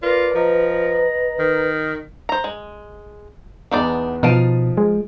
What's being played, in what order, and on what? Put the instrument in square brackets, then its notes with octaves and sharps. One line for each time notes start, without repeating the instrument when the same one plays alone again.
[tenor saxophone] F4 [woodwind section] A#4 D5 [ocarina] B4
[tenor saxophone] F3 [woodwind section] D#5 A#5
[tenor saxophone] D#3
[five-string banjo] C5 A#5
G#3
[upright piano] E2 B3 [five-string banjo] D4 D#4 D5
[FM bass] B2 [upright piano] F3 D7 D#7 [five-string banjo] D#4 F5 A5
[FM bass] G#3